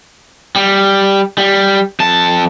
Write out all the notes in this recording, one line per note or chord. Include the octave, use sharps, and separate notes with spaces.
G3
G3
F2 A5